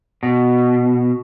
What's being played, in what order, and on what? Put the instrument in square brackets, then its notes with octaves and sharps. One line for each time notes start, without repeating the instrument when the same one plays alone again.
[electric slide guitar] B2